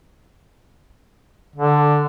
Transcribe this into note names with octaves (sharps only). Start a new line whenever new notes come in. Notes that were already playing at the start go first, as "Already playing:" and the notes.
D3